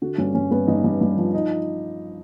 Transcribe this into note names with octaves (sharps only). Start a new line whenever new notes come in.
D3 F#4
G2 C#4
G2 C#4
G2 B3
G2 D#4
G2
G2
F3
D#4